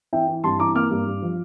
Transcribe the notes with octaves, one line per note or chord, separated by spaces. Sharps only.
E3 E5 G5
E3
G2 A5 C6
E3 A#5 D6
A#3 D6 F6
G2
G2
F3